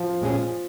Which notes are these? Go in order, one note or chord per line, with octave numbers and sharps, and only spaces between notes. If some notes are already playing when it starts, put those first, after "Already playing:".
Already playing: F3
A#2 G#3 C#4 G#4